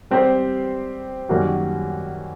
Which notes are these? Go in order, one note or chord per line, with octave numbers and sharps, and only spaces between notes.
G3 C4 G4 C5
F#2 D#3 G3 A#3 F#4